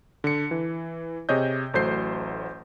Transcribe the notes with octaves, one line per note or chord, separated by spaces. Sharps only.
D3 C#7
E3
C3 G#4 C#5 D#5 G6
A1 F#3 A3 C5 G6 C7